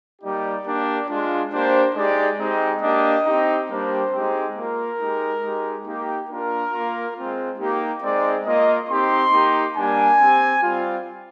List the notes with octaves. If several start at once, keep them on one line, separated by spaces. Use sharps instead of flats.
G3 A#3 D#4 G4 D5
A#3 D4 G4
G#3 D4 F4
A#3 D4 G4 C5
G#3 D#4 G4 D5
G#3 C4 D#4 G4 D#5
A#3 D4 G4 D#5
C4 D#4 G4
G3 A#3 D4 G4 C5
G#3 C4 D#4 G4
A#3 F4 A#4
G#3 D#4 G4
G#3 D#4 G4
A#3 D#4 G4
A#3 D4 F4 A#4
A#3 F4
G#3 C4 F4
A#3 D#4 G4
G#3 C4 D#4 D5
A#3 F4 D#5
C4 D#4 G4 C6
A#3 D#4 G4
G3 A#3 D4 G4 G#5
C4 G4
G3 C4 F4